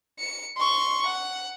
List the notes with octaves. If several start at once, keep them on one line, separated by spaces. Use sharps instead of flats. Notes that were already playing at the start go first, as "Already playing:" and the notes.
C#7
C6 C#6
F#5